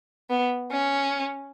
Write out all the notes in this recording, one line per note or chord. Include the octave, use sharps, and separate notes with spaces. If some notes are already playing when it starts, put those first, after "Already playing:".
B3
C#4